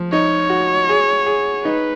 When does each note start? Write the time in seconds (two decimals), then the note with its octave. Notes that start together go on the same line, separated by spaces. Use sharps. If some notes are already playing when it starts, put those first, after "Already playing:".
Already playing: F3
0.12 D#4 C#5
0.50 F#4
0.89 G#4
1.26 G#4
1.65 D#4 B4